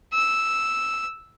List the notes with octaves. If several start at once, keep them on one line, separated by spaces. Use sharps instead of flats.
E6